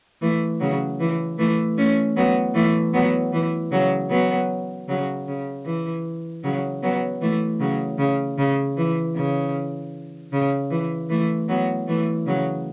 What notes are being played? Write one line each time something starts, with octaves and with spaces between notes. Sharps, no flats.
E3 A3
C#3 F#3
E3
E3 A3
A3 C#4
F#3 B3
E3 A3
F#3 B3
E3
C#3 F#3
F#3 B3
C#3 F#3
C#3
E3
C#3 F#3
F#3 B3
E3 A3
C#3 F#3
C#3
C#3
E3
C#3
C#3
E3
E3 A3
F#3 B3
E3 A3
C#3 F#3